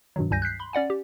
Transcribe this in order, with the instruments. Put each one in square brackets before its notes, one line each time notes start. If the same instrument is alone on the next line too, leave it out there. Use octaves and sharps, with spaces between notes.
[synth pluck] G2 B2 D#3 F#3
C#2 G2 G3 G#5 G6 A#6
F#6 G6 B6 C7
B5 C6
C#4 D5 F#5 G#5
G4